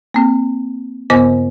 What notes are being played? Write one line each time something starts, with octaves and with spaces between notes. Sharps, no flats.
A#3 C4
G2 C#3 B3 C5 D#5